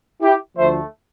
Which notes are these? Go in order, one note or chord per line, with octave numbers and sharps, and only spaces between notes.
E4 G4
D2 D3 F3 A3 C5 E5